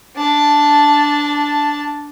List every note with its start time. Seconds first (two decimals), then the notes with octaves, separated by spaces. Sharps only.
0.17 D4 A5